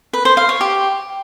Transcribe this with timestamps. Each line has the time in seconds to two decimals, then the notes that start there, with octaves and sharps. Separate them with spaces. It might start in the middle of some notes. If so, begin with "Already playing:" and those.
0.13 B4
0.25 C5
0.37 F5
0.49 C#5
0.61 G4